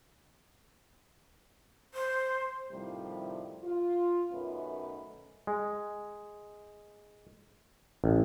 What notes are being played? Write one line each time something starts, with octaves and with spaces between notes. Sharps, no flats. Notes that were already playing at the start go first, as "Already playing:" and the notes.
C5
A2 C3 D#3 F3 G3
F4
F#2 B2 D#3 A3 C#4 B4
G#3
A1